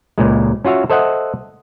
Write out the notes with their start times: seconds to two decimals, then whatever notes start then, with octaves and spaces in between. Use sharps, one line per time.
0.18 C#2 A#2 G#3
0.65 C#4 F4 F#4 E5 F5
0.90 A4 C5 D#5 E5 F#5